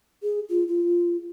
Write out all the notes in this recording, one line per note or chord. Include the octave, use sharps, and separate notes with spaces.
G#4
F4
F4